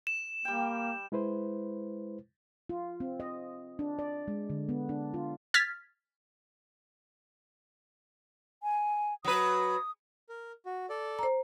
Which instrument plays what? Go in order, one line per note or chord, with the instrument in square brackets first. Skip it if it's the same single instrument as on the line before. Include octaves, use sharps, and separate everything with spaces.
[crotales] E7
[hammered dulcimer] G3 G5 [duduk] A#3
[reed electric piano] G#3 E4 B4 C5
[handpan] F4
C4
D#5
D4
D5
G#3
D3
B3
D4
F4
[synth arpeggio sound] F6 G#6 A6 B6
[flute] G#5
[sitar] F#3 B4 [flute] D#6
[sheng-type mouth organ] A#4
F#4
A4 D5
[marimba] C5 A#5